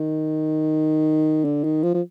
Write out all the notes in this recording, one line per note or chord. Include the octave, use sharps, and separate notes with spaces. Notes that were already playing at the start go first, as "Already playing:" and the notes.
Already playing: D#3
D3
D#3
F3
F3